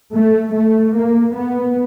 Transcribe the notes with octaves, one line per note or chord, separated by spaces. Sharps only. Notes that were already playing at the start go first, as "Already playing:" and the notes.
A3
A3
A#3
B3